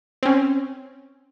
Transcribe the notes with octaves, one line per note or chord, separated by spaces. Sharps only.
C4 C#4